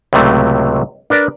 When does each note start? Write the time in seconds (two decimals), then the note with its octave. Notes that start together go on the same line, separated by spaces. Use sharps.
0.13 C#2 A2 C3 F#3 A3
1.10 D4 A#4 B4 D5